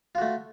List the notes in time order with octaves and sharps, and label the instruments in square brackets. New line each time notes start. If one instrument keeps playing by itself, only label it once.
[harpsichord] F4
F#4
A3